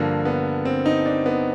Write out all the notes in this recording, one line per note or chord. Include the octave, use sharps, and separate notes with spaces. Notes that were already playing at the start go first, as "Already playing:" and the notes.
Already playing: G2 D3 F3 A#3
B3
C4
D#4
D4
B3